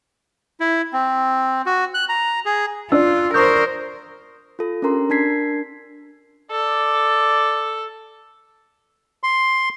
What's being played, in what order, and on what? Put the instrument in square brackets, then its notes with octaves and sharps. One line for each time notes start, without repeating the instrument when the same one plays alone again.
[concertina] E4
C4
F#4
F#6
A#5
G#4
[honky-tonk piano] D4 [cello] F4 [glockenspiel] E6
[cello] A#4 C5 [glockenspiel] C#6 D#6 G6
[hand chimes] F4 A4
C#4 D4 G4 A#4 A#5 C6
D4 A#4 A5 G#6 B6 C7
[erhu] A4 [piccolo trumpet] D5
[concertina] C6